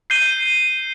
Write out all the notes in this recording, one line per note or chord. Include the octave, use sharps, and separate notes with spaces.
G6 C7 D#7 G7